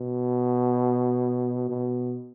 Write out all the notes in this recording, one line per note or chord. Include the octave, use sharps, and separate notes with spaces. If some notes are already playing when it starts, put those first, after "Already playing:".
Already playing: B2
B2